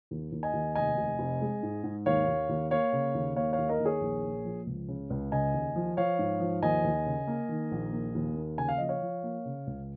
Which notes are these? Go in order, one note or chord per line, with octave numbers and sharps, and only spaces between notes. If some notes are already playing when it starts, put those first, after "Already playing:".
D#2
D#2
D#5 G#5
D#2
F1 D#5 G#5
F1
F1
G#3
G#2
G#2
D#2 C#5 F5
D#2
D#2
A#3 C#5 F5
C#3
D#2
A#3 C#5 F5
C#5 F5
D#2
A#4 D#5
D#2
G#4 C#5
A#1
A#2
F3
C#2
C#3
C#2
C#3 D#5 G#5
D#2
F3
F3 C#5 F5
G#2
F3
D#2 D#5 G#5
D#2
C#3
A#3
D#3
A#1
A#3
D#2
A#3
C#3 G#5
F5
F3 D#5
C#5 F5
F3
A#3
C#3
C#2